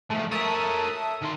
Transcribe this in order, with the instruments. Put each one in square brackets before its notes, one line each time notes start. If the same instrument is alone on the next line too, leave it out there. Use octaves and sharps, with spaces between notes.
[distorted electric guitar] F3 G#3 [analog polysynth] A3
[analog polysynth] A4 E5 D#6 [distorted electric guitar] A#4 C#5
[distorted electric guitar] D#3 C6